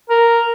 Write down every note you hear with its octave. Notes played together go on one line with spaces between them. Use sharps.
A#4